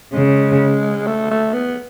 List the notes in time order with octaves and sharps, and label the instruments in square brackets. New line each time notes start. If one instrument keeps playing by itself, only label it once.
[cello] C#3 [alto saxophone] G#3
[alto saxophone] A3
A3
B3